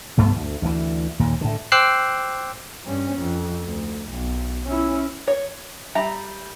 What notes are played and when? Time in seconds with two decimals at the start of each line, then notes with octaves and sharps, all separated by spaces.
0.17 C2 G2 A3 B3
0.36 D2
0.62 D2 E3
1.20 D#2 A#2
1.41 A2 D3
1.72 C5 G5 D6 E6 F#6 C7
2.84 G2 C#4
3.18 F2
3.62 D2
4.08 B1
4.66 C#4 E4
5.28 C#5
5.95 G3 E5 A#5